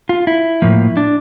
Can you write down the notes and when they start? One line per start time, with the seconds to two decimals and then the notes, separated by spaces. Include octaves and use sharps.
0.09 F4
0.27 E4
0.62 A2 F3 A#3
0.97 D4